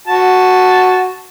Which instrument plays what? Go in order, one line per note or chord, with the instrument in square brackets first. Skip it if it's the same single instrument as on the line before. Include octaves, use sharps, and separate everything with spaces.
[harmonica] F#4 A5